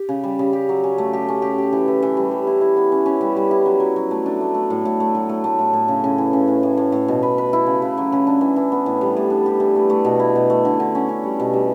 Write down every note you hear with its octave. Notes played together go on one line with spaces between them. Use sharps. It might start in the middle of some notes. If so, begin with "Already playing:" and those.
Already playing: G4
C#3
G3
C#3
G4
F#3
C#4
A3
G4
C#4
G4
G4
E3
E3
E3
G3
G3
E4
E4
B3
C#4
C#4
G3
G3
E4
F#3
F#3
F#3
A3
D4
A3
A3
A2
A2
A3
F#3
A3
A3
A2
A2
C#3
C#3
E3
C#3
A2
A2
A2
A2
B2
B4
B4
E4
C#3
C#3
F#3
C#3
D4
E3
E3
B3
A2
G3
A2
D4
G4
E3
A3
A3
B2
E4
B2
A3
D3
D3
C#4
C#4
G3
B2
G3